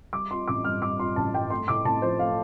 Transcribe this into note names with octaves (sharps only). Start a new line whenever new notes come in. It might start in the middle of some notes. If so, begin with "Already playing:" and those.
G3 D6
F4 C6
A1 D6
G2 F6
G3 D6
F4 C6
A1 A5
G2 G5
A3 C6
A2 D6
A2 A5
F3 C5
A3 F5